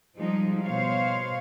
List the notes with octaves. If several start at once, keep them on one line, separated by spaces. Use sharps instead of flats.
F3 G3 G#3 D#4
B2 C5 C#5 F5